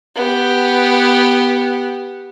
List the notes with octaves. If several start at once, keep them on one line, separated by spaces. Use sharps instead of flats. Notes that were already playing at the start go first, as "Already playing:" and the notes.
B3 G4